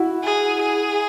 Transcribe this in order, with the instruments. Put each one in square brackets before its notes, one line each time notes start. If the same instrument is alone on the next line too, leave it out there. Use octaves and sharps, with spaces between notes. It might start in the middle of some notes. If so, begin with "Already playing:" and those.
Already playing: [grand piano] E4 F#4
[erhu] G#4
G#4